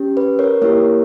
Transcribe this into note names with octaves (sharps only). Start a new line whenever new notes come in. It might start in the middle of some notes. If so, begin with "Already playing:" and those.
Already playing: C#4 G4
B4
A#4 C#5
A#3 E4 G4 A#4 C#5